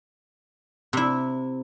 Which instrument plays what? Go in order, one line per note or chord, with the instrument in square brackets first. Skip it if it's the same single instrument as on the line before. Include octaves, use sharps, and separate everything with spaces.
[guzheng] C3 E4